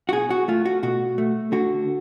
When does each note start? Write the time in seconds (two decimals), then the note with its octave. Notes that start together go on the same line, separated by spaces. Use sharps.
0.09 F#4
0.12 B2 G#4
0.30 F#4
0.48 A3 F4
0.65 F#4
0.83 B2 F#4
1.18 A3
1.52 D3 F#4